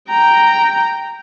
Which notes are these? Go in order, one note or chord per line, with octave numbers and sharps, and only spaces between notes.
G5 A#5